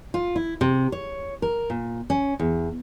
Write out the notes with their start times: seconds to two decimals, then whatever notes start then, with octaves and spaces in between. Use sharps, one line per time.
0.14 F4
0.36 E4
0.61 C3
0.92 C#5
1.42 A#4
1.70 A#2
2.10 C#4
2.40 E2